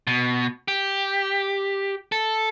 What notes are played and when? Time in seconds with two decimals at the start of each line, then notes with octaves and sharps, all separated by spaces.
0.07 B2
0.68 G4
2.12 A4